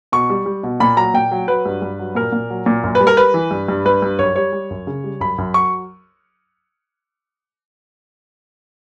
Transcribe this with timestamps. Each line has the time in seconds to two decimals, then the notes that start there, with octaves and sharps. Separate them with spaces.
0.12 B2 C#6
0.30 G3
0.46 G3
0.63 B2
0.80 A#2 B5
0.97 F#3 A#5
1.14 A#2 G5
1.31 F#3
1.48 F#3 B4
1.66 G2
1.82 G2
1.99 F#3
2.15 A#2 A#4
2.33 A#2
2.50 F#3
2.66 A#2
2.84 F#2
2.95 B4
3.00 G3
3.07 A#4
3.17 G3 B4
3.34 E3
3.51 G2
3.68 G2
3.85 G2 B4
4.02 G2
4.19 F#2 C#5
4.36 G3 C#5
4.53 G3
4.71 F#2
4.87 C#3
5.04 G3
5.20 F#2 B5
5.38 F#2
5.54 F#3 C#6